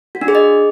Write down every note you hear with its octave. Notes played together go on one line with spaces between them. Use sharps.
F#4
D4
G#4
D#5